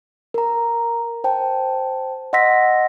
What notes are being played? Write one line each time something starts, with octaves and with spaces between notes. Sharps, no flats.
A#4 A#5
C5 G5 A5
D#5 F#5 C6 E6 A#6 B6